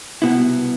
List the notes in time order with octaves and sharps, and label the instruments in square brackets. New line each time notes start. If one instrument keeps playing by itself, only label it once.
[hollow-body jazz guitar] C2 B2 B3 E4